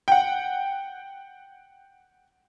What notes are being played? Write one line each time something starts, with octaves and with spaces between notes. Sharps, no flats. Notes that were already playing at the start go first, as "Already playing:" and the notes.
F#5 G5